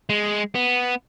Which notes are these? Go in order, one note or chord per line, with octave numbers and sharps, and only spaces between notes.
G#3
B3